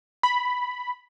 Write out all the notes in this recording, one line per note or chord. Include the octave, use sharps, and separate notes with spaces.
B5